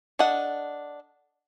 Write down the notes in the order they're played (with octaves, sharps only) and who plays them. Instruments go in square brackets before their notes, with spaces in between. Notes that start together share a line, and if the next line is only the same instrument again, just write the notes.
[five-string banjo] D4 A4 D#5 F#5